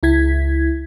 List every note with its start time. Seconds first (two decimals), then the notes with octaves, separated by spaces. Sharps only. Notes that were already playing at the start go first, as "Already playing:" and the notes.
0.03 C#2 E4 G#6 B6